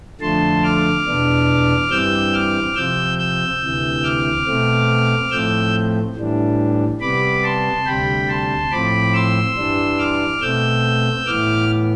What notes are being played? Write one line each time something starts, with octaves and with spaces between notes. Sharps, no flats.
F2 D3 F3 A3 A5 C6
D6 F6
E2 B2 B3 D4
G2 E3 G3 C4 E6 G6
D6 F6
C3 F3 C4 E6 G6
E6 G6
D2 C3 E3
D6 F6
B2 A3 C4
A2 F3 A3 C4 E6 G6
A2 E3 G3 D4
C3 G3 B3 B5 D6
A5 C6
D2 C3 G3 G5 B5
A5 C6
A2 F3 C4 B5 D6
C6 E6
G2 E3 G3 D4
D6 F6
B2 A3 C4 E6 G6
A2 E3 B3 D6 F6